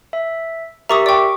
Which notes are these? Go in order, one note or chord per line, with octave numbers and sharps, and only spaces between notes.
E5
G4 A#4 E5 A#5 C#6 D#6
D5 G5 C#6 D6